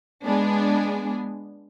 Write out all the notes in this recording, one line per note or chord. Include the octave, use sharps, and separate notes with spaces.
G#3 B3 D4 G#4